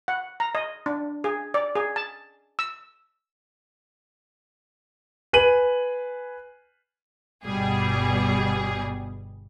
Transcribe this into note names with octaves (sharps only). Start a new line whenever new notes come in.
F#5
A#5
D#5
D4
G#4
D5
G#4
A5
E6
B4 G#5 D#7 F#7
G1 B2 G3 G#4